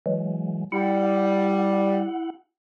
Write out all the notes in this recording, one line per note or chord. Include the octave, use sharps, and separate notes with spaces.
E3 F#3 G#3
G3 E4 F#5